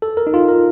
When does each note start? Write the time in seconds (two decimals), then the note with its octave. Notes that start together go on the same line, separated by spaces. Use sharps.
0.02 A4
0.17 A#4
0.27 D#4
0.34 F4
0.48 A#4